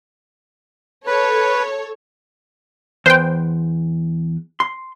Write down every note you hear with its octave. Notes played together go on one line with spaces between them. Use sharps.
A4 B4 C#5
E2 B4 C5 G5
C6